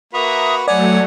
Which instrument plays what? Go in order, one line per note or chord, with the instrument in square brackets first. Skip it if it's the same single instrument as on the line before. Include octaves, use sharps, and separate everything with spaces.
[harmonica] A#3 F#4 B4 [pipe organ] E5 A#5 D#6
[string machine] F#3 A3 [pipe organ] C#5 [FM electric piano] D5 [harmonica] F#5 G#5